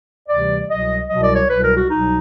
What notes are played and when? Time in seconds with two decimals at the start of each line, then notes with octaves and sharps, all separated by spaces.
0.28 D2 C3 E3 G3 D5
0.69 C2 B2 F#3 D#5
1.09 C2 B2 F#3 D#5
1.22 D5
1.35 C#5
1.49 C2 B2 F#3 B4
1.62 A#4
1.75 F#4
1.89 C2 B2 F#3 D#4